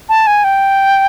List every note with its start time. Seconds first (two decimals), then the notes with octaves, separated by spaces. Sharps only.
0.09 A5
0.27 G#5
0.44 G5